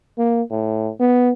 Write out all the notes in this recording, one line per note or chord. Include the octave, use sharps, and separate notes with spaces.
A#3
A2
B3